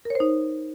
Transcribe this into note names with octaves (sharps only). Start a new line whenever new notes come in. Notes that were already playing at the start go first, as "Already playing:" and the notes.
D#4 A#4 C5 C#5